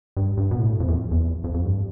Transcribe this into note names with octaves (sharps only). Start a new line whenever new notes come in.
G2
G2
B2
A2
F2
E2
F2
E2
F2
F2
G2